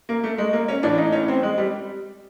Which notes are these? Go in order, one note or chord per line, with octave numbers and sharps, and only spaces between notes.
A#3
A3
G#3
A#3
C#4
A2 E3 D4
D#4
C#4
C4
G#3
G3